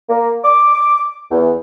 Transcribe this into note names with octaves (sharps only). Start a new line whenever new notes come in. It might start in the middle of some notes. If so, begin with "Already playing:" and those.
A#3
D6
E2